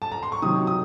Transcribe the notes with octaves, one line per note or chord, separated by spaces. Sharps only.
A5
A#5
C6
C#6
C3 D#3 F#3 D#6
D#6